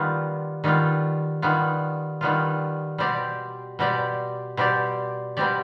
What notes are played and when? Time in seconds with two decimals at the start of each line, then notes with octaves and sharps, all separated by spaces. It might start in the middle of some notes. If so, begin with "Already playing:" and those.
Already playing: D#3 G3 B3 F4
0.64 D#3 G3 B3 F4
1.42 D#3 G3 B3 F4
2.21 D#3 G3 B3 F4
2.98 B2 G3 C4 G4 D5
3.79 B2 G3 C4 G4 D5
4.57 B2 G3 C4 G4 D5
5.37 B2 G3 C4 G4 D5